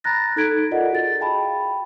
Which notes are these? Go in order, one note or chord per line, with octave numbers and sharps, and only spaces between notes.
A#5 B5 F#6 A6 A#6
D#4 A4 A#5 G#6 B6 D7
A4
F4 A4 A#4 D5 D#5 F#5
F#4 G#4 A6
F5 G5 A5 B5